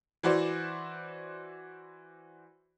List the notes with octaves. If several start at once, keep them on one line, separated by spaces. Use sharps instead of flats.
E3 E4 F#4 C5 D5